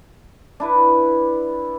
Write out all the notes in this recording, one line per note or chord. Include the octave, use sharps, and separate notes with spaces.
D4 E4 B4